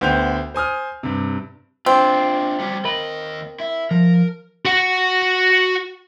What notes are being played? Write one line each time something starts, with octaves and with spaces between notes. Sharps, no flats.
D2 B3 C5 G5 G6 F7
C5 G#5 D#6 F6
G2 C3
C4 D4 F4
F#3 G3
D#2 A#4 D#5 B5
E4
F3 A#4
F#4 F#5